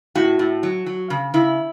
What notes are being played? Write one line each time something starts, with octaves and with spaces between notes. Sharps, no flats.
A2 F#4
A2
F#3
F#3
C#3
C#3 E4